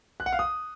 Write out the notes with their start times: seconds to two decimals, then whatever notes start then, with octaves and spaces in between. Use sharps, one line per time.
0.20 F#6
0.26 F#5
0.33 F5
0.39 D#6